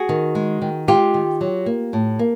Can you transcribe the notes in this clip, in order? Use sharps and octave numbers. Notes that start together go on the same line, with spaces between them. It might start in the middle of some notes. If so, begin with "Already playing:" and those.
Already playing: F#4 G#4
D#3
G#3
D#3
G#3 F4 G4
D#3
F#3
A#3
A2
A#3